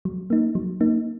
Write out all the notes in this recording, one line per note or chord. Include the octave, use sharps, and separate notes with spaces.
F#3
A#3 D#4
F#3
A#3 D#4